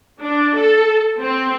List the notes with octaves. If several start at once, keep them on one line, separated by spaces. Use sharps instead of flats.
D4
A4
C4